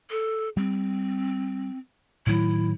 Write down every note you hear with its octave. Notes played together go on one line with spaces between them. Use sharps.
A4
G3 C4
A2 D#3 F#3 E4